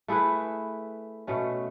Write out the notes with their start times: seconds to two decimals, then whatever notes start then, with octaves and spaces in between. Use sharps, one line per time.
0.08 A3 E4 G#4 B4
1.27 B2 A3 C#4